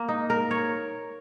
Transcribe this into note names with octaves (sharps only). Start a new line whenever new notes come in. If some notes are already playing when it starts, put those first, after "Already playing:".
Already playing: A#3
D#4
A#4
C#5